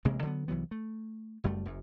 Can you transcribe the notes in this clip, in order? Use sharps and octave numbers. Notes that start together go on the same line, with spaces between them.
A1 C3 G#3 A#3
D3 F#3 A3 B3
C2 E3 F#3 B3
A3
F#1 F#2 G3 A3
F#1 F#2